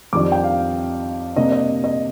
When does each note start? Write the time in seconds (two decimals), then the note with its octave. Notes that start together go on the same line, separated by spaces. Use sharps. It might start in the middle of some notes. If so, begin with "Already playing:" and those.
0.13 F2 D#3 G3 D4 D6
0.32 G5
0.44 F5
1.36 C3 G3 A#3 D4 D#5
1.52 D#5
1.84 D#5